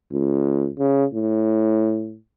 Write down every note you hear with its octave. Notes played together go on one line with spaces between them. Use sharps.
C#2
C#3
A2